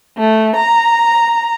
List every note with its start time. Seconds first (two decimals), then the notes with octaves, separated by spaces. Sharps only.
0.18 A3
0.56 A#5